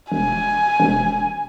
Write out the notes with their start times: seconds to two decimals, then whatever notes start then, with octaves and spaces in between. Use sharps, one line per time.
0.12 E1 G#5
0.80 E1